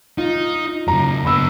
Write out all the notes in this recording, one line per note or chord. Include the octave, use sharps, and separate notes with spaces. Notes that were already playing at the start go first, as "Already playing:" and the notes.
D#4 F4
F#2 C#3 A#5
D3 B3 B5 E6